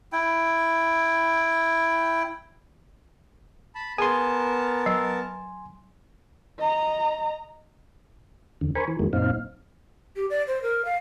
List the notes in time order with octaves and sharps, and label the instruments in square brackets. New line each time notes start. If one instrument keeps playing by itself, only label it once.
[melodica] E4 G5
[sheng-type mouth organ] A5 B5
[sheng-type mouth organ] B3 A#4 A5 [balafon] G#4 [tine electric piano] G#5 C6
[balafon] F#3
[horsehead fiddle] D#5 A#5
[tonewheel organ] E2 D3
A#4 C5 G#5 B5 C#6
E3
F2 D#3 F#3 G#3 A#3
F#2 A#2 C4 D#4 F5
[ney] G4
D5
C5
A#4
F5